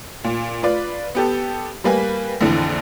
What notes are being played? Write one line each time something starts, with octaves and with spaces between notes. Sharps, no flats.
A#2
F4 B4 D5
B3 G4 A4
G3 A#3 B4 G#5
A#1 F2 D3 E3